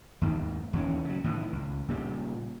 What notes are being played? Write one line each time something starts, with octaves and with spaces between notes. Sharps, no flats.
D#2 G#2 D#3
D#2 E3 C#4
C#3 F#3
A2 D#3 E3
C#2
A#2 C#3 G3